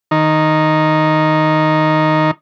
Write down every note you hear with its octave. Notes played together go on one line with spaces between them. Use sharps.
D#3 D#4